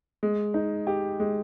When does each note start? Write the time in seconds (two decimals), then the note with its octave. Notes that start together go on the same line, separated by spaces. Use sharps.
0.23 G#3
0.54 D#4
0.87 G4
1.20 G#3